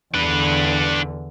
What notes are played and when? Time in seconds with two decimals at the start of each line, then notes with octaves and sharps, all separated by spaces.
0.14 E2 D3 D4 B4